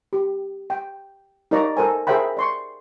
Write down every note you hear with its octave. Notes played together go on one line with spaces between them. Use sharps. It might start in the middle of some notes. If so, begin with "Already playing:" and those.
G4
G5
D#4 A#4 C#5 D5 A#5
A4 A#4 C5 G#5
G#4 A#4 C5 E5 G5 B5
D5 C6 C#6